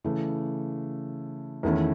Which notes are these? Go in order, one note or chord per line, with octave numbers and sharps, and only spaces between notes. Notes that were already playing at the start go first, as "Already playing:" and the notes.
C#3 E3 A3
E2 D#3 A3 C#4 E4